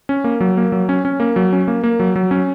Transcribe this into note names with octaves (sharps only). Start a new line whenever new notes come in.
C#4
A#3
F#3
A#3
F#3
C#4
C#4
A#3
F#3
C#4
A#3
A#3
F#3
F#3
C#4